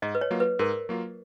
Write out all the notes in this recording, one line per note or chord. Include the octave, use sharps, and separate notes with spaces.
G#2 D#5
B4
C#5
F#3 A#3 F4
B4
G#2 A#4
F#3 A#3 F4